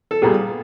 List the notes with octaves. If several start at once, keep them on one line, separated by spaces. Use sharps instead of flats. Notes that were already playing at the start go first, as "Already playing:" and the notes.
A4
A#2 G3 B3 G#4